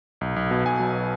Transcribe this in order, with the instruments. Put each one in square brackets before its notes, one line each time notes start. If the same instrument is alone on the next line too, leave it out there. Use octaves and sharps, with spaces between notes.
[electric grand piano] B1
B1
B2
B1 G#5
F#3